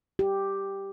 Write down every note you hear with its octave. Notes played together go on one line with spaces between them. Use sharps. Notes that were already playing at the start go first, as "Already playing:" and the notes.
G4